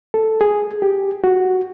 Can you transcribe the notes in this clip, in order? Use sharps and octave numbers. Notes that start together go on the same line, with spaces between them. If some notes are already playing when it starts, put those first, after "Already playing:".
A4
G#4
G4
F#4